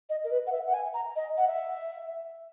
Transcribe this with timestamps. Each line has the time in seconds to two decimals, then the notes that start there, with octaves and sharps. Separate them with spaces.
0.09 D#5
0.24 A#4
0.31 B4
0.46 F#5
0.51 E5
0.66 F#5
0.73 G#5
0.94 A#5
1.15 D#5
1.37 F#5
1.47 E5